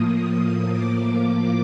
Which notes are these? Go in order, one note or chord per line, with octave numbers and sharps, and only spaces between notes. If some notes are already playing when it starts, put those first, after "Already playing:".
Already playing: A2 F3 A#3 D#6
A2 F3 A#3 D6